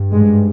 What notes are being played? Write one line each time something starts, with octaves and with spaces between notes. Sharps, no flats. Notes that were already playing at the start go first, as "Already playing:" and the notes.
Already playing: G2
G#2 G#3